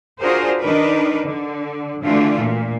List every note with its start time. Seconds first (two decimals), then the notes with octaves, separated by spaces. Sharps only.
0.20 D4 F4 F#4 G#4 A#4 C5
0.60 D#3 D4 D#4 A#4 B4
1.24 D3
2.03 D3 E3 A3 D4 F4 F#4
2.40 A#2